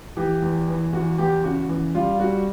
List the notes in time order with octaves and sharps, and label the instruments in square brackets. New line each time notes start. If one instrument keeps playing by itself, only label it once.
[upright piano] E3 G4
E2
E3
E2 F#4
E2 G4
C#3 F#4
E3
G3 F4
G3 F#4